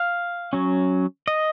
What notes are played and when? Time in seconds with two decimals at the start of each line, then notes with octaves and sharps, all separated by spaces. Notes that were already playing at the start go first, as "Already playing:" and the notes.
Already playing: F5
0.53 F#3 C#4
1.28 D#5